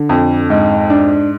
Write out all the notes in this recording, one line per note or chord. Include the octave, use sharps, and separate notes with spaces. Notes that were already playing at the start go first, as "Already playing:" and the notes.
Already playing: D3
F2
G#2
D4